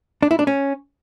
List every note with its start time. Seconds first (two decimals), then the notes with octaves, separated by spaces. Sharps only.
0.23 D4
0.31 E4
0.39 D4
0.47 C#4